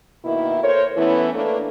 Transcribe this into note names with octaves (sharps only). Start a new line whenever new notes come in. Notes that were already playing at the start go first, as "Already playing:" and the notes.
B2 D#3 A#3 E4
A4 A#4 C5 C#5
E3 A3 B3 C#4 E4
A3 A#3 D4 A4 B4